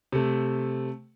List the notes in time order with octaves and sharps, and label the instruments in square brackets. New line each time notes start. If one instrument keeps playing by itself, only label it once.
[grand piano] C3 A3